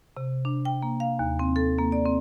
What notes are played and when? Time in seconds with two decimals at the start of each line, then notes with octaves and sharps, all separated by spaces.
0.17 C3
0.45 D4
0.65 G5
0.82 A#3
1.00 F5
1.19 D#2
1.39 C4
1.56 A4
1.78 A#3
1.92 D5
2.06 C4